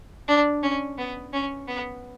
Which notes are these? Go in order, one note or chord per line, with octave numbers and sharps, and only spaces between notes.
D4
C#4
B3
C#4
B3